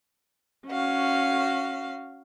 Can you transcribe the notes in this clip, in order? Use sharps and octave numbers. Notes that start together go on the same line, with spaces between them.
C#4 F#4 F5